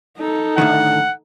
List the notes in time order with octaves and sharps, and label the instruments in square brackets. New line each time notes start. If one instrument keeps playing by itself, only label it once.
[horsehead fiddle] D#4 A4
[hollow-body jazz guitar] A2 D3 D#3 [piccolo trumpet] F#5